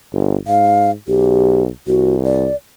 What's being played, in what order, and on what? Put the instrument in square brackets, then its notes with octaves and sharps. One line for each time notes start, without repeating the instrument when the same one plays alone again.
[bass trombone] G1
[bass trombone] G#2 [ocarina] F5
[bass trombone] B1 [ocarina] G4
[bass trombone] C2 [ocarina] F#4
[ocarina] D5